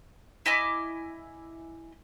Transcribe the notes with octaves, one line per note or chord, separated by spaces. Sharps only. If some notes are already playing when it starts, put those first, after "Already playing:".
E4 D#5 G#5 D6